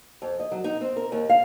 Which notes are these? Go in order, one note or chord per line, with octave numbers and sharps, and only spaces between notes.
F2
D#5
F#3
D#4
C4
A#4
D#2
F5